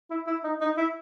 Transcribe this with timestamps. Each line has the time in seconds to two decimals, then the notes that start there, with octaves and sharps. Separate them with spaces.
0.10 E4
0.27 E4
0.44 D#4
0.61 D#4
0.77 E4